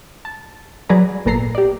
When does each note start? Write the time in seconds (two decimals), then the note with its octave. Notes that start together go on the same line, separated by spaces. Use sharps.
0.25 A5
0.89 F#3 G#4 B4 D5 A#5
1.25 G#1 A#2 B3 A4 A#5 C7
1.55 G4 D5